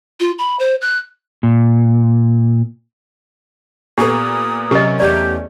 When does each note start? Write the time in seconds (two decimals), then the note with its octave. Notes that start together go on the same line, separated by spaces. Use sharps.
0.20 F4
0.38 B5
0.59 C5
0.81 F#6
1.43 A#2
3.98 A#2 B3 G4 A4 D#6
4.71 C3 F#3 C#4 G4 A#4 D#5
5.00 E2 A3 C#4 G4 D5